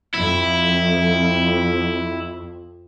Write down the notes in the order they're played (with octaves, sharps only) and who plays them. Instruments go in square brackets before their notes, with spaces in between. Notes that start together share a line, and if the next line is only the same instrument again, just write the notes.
[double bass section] F2 [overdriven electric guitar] E4